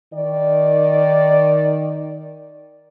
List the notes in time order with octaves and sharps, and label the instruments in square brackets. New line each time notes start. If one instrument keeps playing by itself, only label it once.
[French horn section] D#3 D5